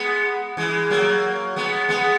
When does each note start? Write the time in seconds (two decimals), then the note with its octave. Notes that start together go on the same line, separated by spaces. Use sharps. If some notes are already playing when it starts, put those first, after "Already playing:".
Already playing: G#3 B3
0.57 E3 G#3
0.91 F#3 A#3
1.56 G#3 B3
1.89 G#3 B3